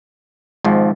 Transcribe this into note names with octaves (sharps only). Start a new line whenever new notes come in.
G#1 G#2 F3